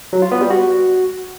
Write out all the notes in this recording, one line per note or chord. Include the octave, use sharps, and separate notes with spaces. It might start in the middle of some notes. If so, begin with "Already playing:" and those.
F#3
F4
B3
G3
F#4